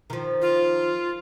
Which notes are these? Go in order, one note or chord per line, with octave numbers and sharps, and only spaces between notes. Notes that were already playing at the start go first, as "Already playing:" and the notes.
D#3 F3
F4